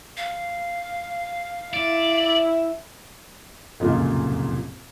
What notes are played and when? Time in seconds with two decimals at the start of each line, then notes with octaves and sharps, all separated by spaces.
0.17 F5
1.74 E4 D5
3.80 F1 C#2 F#2 A#2 F4